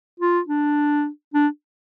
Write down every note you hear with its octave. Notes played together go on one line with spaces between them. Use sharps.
F4
D4
D4